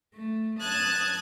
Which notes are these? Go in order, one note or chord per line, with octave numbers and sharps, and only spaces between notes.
A3
A5 D#6 F#6 G#6